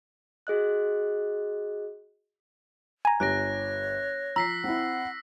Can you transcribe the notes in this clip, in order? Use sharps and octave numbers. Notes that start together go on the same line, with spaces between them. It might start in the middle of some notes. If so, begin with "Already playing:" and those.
F#4 G#4 D#5 F#6
G#5 A#5
G1 G4 C#5 F#6 A#6 D7
F3 A#5 E6 B6 C7
C4 E4 F#5